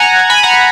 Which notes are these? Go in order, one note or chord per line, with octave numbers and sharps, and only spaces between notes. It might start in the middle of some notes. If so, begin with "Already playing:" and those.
Already playing: F#5 G#5 A#5
G#5 B5
F#5 A#5